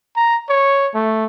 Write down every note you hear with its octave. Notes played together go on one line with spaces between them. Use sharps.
A#5
C#5
A3